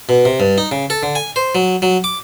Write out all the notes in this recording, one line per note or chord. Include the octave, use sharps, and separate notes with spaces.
B2
C3
G2
D#4
C#3
A4
D3
G#5
C5
F#3
F#3
D6